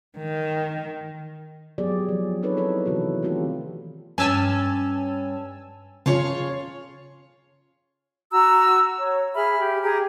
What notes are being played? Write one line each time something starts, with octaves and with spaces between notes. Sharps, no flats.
D#3
F#3 B3 G4 G#4 D5
F3
C4 D#4 A4 B4 C#5
E4 A4 B4
C3 D#3 E3 B3 F#4
D#3 A3 C4 F4 G4 A4
G2 C#4 G#5 A5 E6
C#3 F4 G#4 C#5
F#4 A#5 E6
C#5
G#4 E5 B5 F6
G4
G4 G#4 A#5